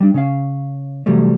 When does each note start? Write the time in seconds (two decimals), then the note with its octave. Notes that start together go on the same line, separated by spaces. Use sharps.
0.01 G3 D4
0.14 C#3 C#4 F5
1.06 C3 E3 F#3 G3 A3